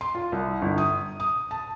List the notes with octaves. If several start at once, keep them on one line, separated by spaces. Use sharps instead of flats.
C6
F4
C2
G1
D#6
D#6
A5